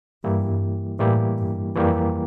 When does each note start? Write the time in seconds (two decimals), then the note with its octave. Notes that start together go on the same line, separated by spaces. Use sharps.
0.24 G2 E3 G3 A#3 E4 G4
0.99 A2 E3 G3 A#3 E4 G4
1.38 G2
1.75 F2 E3 G3 A#3 E4 G4